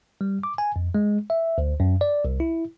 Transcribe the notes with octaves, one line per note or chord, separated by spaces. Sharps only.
G3
D6
G#5
F2
G#3
E5
D2
F#2
D5
C2
E4